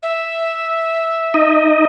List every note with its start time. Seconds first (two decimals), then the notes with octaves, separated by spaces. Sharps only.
0.02 E5
1.34 D#4 D#5